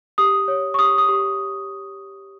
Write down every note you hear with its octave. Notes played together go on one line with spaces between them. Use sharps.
G4 D#6
C#5
C#6
G4 D#6
D#6
G4